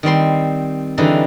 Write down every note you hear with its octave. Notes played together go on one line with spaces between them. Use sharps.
D#3 G3 C4 C6
D3 E3 G3 D#4 F4 G#4